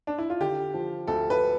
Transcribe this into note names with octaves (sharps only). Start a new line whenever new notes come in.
D4
E4
F4
D3 G4
F3
D2 A4
B4